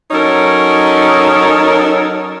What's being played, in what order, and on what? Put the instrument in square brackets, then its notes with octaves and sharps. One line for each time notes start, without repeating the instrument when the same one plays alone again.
[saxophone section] F#3 C#4 D#4 A4 A#4 C#5